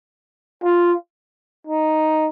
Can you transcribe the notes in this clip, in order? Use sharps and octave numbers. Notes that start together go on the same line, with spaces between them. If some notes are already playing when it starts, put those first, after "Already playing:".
F4
D#4